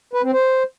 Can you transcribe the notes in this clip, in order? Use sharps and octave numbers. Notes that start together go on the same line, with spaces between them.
B4
C4
C5